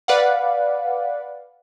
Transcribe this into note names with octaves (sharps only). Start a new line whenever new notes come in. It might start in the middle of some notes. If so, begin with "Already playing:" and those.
B4 D5 F5 F#5